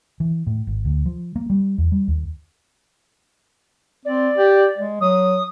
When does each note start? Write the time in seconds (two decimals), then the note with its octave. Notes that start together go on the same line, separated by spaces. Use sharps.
0.20 E3
0.47 A2
0.67 G#1
0.85 D2
1.06 F3
1.36 A#3
1.50 G3
1.78 E2
1.92 G3
2.08 D#2
4.05 C4 D5
4.37 G4
4.78 G#3
5.01 F#3 D#6